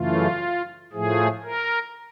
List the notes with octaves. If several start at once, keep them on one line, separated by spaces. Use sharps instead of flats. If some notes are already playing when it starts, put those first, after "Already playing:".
Already playing: F#2 C#3 E3 A3 F4
A2 F3 A3 G#4
A#4